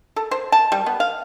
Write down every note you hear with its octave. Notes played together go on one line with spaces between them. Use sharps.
A4
C5
A5
G3
B3
F5